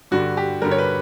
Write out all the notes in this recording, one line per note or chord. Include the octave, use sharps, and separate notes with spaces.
G2 D3 G3 F#4
G4
G2 D3 G3 A#4
C#5
B4